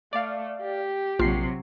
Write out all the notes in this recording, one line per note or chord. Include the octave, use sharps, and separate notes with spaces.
A3 D5 F5
G4
A#1 C3 F#3 F4 C7